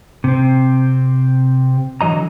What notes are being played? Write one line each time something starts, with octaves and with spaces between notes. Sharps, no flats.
C3 C4
D3 E3 F#3 D#5 A#5